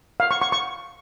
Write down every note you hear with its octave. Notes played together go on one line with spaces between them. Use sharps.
F5
C#6
C#6
C#6